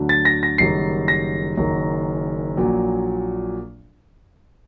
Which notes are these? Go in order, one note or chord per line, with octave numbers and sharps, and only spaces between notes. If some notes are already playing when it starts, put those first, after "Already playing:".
Already playing: D2 D3 F#3
A6
A#6
A#6
F#1 F#2 D#3 G3 C7
A#6
F#1 F#2 D#3
A#1 A#2 F#3